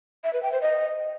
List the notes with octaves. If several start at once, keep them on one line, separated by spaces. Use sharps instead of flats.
E5
B4
G5
C5
D#5